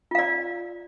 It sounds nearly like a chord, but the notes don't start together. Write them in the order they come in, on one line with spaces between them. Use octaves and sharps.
F4 F5 D5